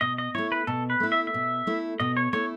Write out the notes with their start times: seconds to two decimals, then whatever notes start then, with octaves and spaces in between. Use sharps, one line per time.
0.01 B2 D#5
0.18 D#5
0.35 A3 E4 C#5
0.52 B4
0.67 B2 A4
0.90 B4
1.00 A3 E4
1.12 E5
1.27 E5
1.34 B2
1.67 A3 E4
2.00 B2 D#5
2.17 C#5
2.33 A3 E4 C#5